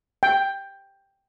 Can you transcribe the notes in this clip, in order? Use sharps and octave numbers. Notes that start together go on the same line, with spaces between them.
G5